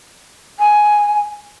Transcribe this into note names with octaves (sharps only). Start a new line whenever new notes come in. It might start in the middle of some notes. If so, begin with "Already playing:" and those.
G#5